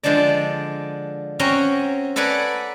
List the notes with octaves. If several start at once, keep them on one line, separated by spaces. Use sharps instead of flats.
D3 F3 G#3 D4 D5
C4 C#4 F#4 A#5
A4 B4 D5 F#5 G#5 A#5